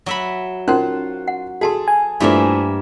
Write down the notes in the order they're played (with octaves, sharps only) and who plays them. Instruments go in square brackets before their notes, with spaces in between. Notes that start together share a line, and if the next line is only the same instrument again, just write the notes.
[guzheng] F#3 E5 B5
[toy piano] C#4 D#4 A#4 [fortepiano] F4 C5 F#6
[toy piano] F#5
[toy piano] F#4 A5 C6 [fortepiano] G#4 A4
[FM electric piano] G#5
[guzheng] G2 A#3 E5 [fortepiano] F3 A3 E4